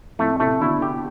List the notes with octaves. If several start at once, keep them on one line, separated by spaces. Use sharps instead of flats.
F2 A2 A3
A2 C3 A3
B2 D3 E4
G4